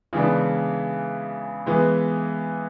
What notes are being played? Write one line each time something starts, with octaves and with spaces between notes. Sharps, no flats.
C#3 E3 G#3 B3 D4
E3 G#3 B3